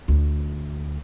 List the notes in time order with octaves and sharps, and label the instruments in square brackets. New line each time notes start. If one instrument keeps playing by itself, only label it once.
[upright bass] D2